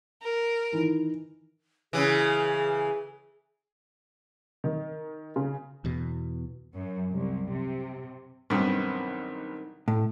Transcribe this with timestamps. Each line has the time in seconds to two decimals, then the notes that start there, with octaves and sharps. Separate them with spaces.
0.22 A#4
0.72 D#3 E3
1.93 C#3 E3 G#4
4.64 D#3
5.36 C#3
5.85 E2 B2
6.74 F#2
7.12 C2
7.52 C3
8.50 B1 G2 D#3 C4
9.88 A2